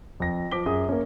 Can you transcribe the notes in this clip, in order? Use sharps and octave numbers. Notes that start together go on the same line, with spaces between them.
F2 A#6
F3 D6 B6 G7
F#2 G#4 D#6
A#3 C#4